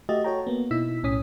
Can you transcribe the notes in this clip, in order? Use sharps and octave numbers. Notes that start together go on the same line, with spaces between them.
A3 F#4 G4 D#5 E5 A6
F#4 A4 C#5 G5 A#5
A#3 B3
B2 D#4 E4 E6 B6
B1 A2 C#4 D#6 B6